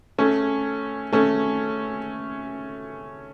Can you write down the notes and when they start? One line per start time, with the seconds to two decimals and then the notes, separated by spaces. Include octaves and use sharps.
0.18 A3 C#4
1.13 A3 C#4